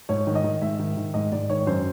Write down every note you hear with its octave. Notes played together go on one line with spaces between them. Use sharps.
G#2 C#5
D#3
D#5
D#3
G#2 E5
D#3
D#3
G#2 D#5
G#2 D5
D#3 C#5
F#2 C5